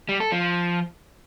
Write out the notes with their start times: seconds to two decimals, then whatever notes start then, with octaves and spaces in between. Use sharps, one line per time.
0.09 G3
0.20 A4
0.32 F3